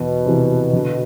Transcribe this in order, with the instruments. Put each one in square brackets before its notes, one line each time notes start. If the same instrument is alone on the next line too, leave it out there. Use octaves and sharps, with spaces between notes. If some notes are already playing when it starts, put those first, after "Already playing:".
Already playing: [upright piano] E2 [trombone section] B2
[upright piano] C3 E3
D3